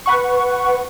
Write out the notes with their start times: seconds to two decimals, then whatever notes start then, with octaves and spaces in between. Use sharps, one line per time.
0.06 B4 F#5 C#6